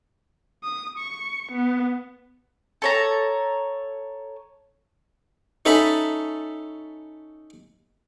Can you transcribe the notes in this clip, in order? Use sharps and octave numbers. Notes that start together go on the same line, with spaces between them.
D#6
C#6
B3
A4 C#5 A#5
C#4 D#4 A4 E5 A5 B5